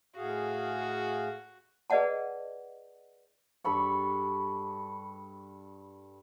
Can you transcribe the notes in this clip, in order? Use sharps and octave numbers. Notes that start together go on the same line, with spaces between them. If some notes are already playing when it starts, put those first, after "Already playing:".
A2 F#4 G#4 F5
G#4 B4 D5 D#5 F#5 A5
G2 A4 B5 C#6